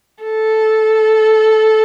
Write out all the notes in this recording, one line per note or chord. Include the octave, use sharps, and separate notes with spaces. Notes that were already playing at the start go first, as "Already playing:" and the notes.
A4